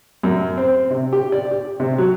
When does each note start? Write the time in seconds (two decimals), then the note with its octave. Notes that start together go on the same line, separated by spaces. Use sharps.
0.23 F#2
0.58 C4
0.91 C3
1.13 G4
1.32 D5
1.51 G4
1.80 C3
1.98 F#3